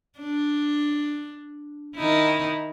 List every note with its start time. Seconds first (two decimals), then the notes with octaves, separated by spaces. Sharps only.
0.19 D4
1.96 D#3 D#4 E4